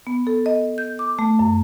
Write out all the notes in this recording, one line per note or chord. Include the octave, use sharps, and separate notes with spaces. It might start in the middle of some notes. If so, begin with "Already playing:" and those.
B3
A4
D#5
G6
D6
A3
F#2